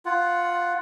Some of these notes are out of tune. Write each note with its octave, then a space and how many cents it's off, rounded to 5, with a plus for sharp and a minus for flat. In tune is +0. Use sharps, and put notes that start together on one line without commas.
F4 +5 F#5 +0